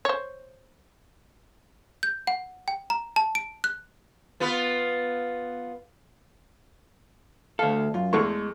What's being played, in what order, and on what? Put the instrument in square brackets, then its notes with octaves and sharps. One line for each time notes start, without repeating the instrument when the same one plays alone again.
[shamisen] C5 C#5
[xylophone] G6
F#5
G5
A#5
A5
D7
F#6
[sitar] B3 F4 B4
[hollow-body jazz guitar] D2 A4 [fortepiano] F5
[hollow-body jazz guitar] F#2 [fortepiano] F4
[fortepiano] E2 A3 C#6 [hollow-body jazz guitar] G#3